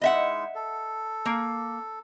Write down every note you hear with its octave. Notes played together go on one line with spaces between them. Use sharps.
G#3 D#4 E4 D#5 E5 F#5
A4
A#3